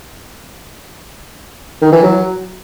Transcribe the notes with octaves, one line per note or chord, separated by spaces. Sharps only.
D#3
E3
F#3